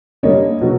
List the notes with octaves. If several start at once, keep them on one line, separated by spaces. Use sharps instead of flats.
D3 G3 A#3 C#5 D#5
B2 F#3